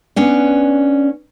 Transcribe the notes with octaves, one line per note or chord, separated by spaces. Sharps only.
B3 C#4 D4